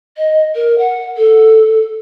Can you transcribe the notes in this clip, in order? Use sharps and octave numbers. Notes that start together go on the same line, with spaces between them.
D#5
A#4
F#5
A4